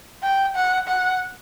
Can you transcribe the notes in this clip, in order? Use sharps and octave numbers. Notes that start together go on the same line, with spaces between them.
G5
F#5
F#5